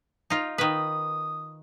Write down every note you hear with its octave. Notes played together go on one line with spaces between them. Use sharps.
D#4 F4
D#3 B4 D#6